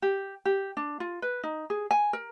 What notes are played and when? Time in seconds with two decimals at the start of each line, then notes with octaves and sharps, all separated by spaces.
0.02 G4
0.45 G4
0.77 D4
1.00 F4
1.22 B4
1.43 D#4
1.70 G#4
1.91 G#5
2.13 A#4